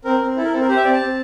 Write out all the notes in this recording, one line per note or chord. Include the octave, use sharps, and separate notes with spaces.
C4 A#4
C4
E4 A4
A#4
C4 A4
A#4
G4 C5
E5
C4 D5
A5
C4